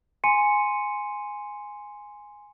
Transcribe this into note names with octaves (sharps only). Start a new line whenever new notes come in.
G#5 C6 C#7 D#7